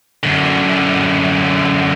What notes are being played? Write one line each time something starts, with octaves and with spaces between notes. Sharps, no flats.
F#2 D3